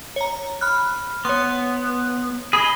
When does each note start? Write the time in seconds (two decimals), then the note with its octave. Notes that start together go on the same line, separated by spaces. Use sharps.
0.16 C#5 A#5
0.61 B5 F6 F#6
1.25 B3 C#5 C6
2.53 G#4 D#5 B5